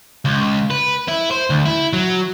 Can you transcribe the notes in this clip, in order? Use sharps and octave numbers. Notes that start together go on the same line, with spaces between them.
C#2
B4
E4
C5
D2
E4
F#3